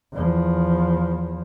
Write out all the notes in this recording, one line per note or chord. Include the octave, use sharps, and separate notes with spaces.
E2 F3